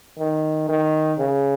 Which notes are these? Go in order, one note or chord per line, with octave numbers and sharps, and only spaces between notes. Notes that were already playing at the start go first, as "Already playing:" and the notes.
D#3
D#3
C#3